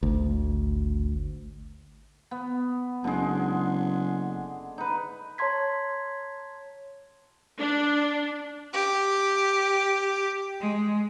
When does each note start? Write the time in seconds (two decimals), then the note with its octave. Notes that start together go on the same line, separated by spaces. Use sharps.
0.03 G#1 D2
2.31 B3
3.04 F#1 D3 G#3
4.78 D#4 B4
5.38 C#5 A5 A#5 C6 G#6 B6
7.58 D4
8.72 G4
10.58 G#3